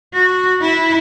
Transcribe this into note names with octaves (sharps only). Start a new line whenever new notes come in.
F#4
E4